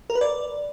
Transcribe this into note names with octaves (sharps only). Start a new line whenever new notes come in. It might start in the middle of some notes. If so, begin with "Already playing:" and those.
A#4
B4
D5